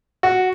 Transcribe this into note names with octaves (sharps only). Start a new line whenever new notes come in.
F#4